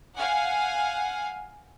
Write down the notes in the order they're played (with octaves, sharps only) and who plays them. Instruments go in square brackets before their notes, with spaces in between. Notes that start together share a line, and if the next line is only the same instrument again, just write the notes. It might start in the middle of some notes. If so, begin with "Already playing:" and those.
[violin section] F5 F#5 G#5